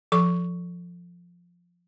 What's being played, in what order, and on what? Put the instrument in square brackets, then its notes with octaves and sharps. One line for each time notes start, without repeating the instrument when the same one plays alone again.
[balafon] F3 A4 C#6